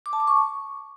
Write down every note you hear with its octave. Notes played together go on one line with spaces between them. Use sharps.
D6
A5
D6
C#6